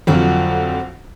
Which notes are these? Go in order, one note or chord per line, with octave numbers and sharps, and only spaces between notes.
F2 D3 F3 F#3 F#4